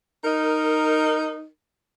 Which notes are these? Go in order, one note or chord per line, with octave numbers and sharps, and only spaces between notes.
D#4 A#4